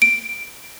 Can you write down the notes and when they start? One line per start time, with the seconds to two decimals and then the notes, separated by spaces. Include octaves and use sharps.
0.02 D7